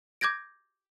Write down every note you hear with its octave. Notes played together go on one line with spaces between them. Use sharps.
D6 G6 G#6 A#6 D7